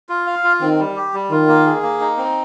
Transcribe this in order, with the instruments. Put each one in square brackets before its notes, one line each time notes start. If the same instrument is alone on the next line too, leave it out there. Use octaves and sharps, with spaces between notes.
[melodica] F4
F5
F4
[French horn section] D#3 [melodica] C4
[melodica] G3
G4
G3
[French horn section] D#3 [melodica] F4
[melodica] A#3
G#4
A#3
D#4
C4